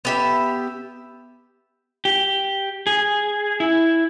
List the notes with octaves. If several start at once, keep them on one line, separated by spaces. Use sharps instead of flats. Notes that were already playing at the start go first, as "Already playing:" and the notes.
B3 G4 E5
G4
G#4
E4